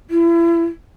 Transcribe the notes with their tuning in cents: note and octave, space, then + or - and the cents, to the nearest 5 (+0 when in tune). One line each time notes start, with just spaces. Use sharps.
E4 +35